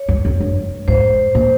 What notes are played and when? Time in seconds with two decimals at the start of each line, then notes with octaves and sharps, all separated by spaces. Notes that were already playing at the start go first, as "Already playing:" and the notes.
Already playing: C#5
0.08 G2
0.25 F2
0.40 G2
0.88 G#2 C5
1.35 A#2 C5